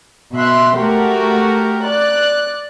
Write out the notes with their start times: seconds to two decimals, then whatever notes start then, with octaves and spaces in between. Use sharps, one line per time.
0.34 B2 E5 C6 F#6
0.78 A3 F#4 G4 A#4
1.85 D5 F#6